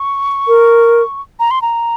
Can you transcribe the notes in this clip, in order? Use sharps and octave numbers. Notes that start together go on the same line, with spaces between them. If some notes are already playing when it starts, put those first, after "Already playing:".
Already playing: C#6
A#4
A#5
C6
A#5